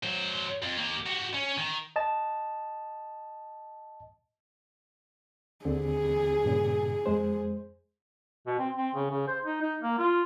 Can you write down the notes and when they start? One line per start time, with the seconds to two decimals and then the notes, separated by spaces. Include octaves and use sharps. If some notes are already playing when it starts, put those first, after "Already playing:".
0.04 F#3 C5
0.63 F2
0.77 A#3 G4
1.06 F#4 G4
1.34 C#4
1.57 D#3
1.96 D#5 A5
5.65 D#2 D3 C4 G#4
6.45 G2 A#2 C#3
7.06 F2 G#3 C5
8.46 B2
8.59 C4
8.77 C4
8.95 C#3
9.10 C#3
9.28 C5
9.44 D#4
9.62 D#4
9.82 A#3
9.98 F4